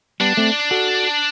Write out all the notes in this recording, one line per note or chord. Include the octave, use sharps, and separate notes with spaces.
G3 B3 D4
A3 C4
F#4 A4